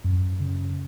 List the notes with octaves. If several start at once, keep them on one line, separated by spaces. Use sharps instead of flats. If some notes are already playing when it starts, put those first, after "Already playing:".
F#2
C#3